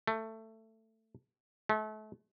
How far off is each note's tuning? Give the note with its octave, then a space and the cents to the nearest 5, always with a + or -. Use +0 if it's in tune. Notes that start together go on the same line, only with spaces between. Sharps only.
A3 +15
A3 -35